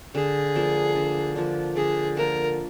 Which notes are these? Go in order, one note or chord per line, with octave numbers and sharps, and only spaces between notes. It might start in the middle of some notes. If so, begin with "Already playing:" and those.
D3 G#4
F3 A#3 D4
D3
F3 A#3 D4
D3 G#4
F3 A#3 D4 A#4